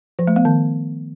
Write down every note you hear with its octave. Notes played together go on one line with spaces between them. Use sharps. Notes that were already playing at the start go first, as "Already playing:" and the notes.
F3
A3
B3
D#3